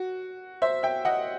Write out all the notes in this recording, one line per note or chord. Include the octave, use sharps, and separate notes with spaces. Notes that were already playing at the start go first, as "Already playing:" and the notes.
Already playing: F#4
C5 E5
E5 G5
D#5 F#5